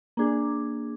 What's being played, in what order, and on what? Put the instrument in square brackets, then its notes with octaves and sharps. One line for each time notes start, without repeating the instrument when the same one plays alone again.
[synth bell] A#3 D4 G#4